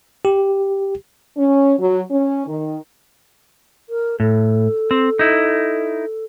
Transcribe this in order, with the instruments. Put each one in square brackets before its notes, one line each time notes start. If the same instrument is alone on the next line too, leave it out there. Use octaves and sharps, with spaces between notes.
[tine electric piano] G4
[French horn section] C#4
F#3
C#4
D#3
[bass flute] A#4
[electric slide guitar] A2 [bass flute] A4
[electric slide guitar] C4
D#4 E4